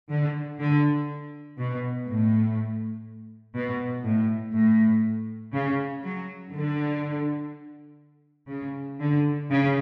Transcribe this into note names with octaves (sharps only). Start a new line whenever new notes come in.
D3
D3
B2
A2
B2
A2
A2
C#3
F#3
D3
C#3
D3
C#3